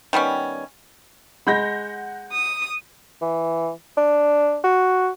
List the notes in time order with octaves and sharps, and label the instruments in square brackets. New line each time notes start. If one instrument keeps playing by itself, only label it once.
[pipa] D#3 G3 B3 C#4
[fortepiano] G#3 B5 [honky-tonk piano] F#5 G6 A#6
[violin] D#6
[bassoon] E3
D4
F#4